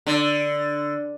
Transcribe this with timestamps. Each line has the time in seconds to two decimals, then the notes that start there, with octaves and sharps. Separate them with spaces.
0.07 D3